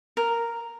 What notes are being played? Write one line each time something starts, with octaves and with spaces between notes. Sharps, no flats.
A#4